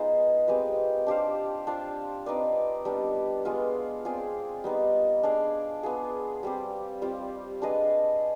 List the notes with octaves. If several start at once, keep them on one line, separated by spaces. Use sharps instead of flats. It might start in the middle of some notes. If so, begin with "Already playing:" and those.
Already playing: B3 D#4 F4 G#4 C5
G#3 C4 G4 B4
D4 G4 C5 F5
D4 F4 C5 F5
C4 D#4 B4 D5
G3 B3 D4
G#3 B3 F4
C4 F4 G#4 D5
G3 B3 D#4
D4 G#4 D5 F5
B3 F4 G#4
G3 C4 G4
G3 C4 F4
D4 G#4 B4 D#5